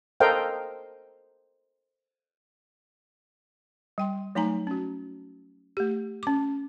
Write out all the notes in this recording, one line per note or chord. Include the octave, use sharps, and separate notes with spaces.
A4 A#4 C5 D#5 F5 G5
G3 G5 C6
F#3 A3 D#4 G#5 A#5
C#4 F#4
A3 G4
C#4 D6